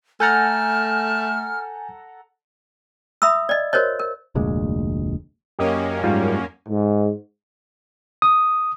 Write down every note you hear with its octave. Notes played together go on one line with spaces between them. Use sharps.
A3 A4 F#5 G#5 A#5 F6 G6 A6
E5 B5 D#6 E6
D5 D#5
F#4 A#4 C5 C#5 D#5
A#4
F1 D2 A#2 G#3
F#2 A#3 C#4 G4 D#5
G#2 G3 F4
G#2
D#6